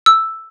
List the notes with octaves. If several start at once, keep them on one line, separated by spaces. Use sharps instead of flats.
E6